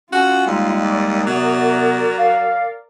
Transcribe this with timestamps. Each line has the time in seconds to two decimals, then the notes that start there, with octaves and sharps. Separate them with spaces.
0.13 C#4 F4 F#4
0.47 D#2 G3 G#3
0.91 A#4 D5
1.27 C3 F#3 B3
2.19 F5